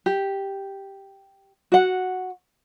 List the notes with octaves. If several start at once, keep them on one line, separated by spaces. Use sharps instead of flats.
G4
F#4 F#5